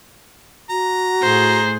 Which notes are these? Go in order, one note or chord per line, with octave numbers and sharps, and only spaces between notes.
F#4 A#5
A2 G#4 C5